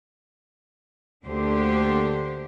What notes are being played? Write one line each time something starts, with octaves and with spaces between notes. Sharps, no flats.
D2 D3 A#3 D4 G4 C5